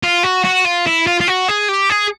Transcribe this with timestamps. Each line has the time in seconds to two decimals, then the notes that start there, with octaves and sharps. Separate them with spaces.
0.03 F4
0.24 F#4
0.45 F#4
0.65 F4
0.87 E4
1.07 F4
1.20 F4
1.28 F#4
1.48 G#4
1.69 G4
1.90 G#4